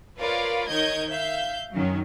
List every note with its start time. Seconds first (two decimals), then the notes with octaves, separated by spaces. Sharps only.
0.17 F4 A#4 B4 C#5 D5 F5
0.67 D#3 A#4 C#5 D#5 G6 G#6
1.09 E5 F5 G6
1.73 F#2 D#3 F#3 C#4